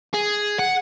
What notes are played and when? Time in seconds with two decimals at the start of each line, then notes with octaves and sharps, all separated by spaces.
0.14 G#4
0.59 F#5